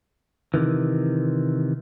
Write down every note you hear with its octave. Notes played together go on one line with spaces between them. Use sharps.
C3 D#3 E3